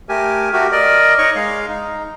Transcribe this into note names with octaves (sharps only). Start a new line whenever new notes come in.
A3 G4 A#4 G#5
A3 F#4 G4 A#4
A#4 D5 D#5
D#4 C#5 D#5 C#6
G#3 F5
D#4